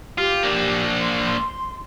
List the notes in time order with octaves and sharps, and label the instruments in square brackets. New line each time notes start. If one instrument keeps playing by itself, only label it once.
[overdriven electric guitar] F4 [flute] G4
[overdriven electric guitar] A#3 D4
[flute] C6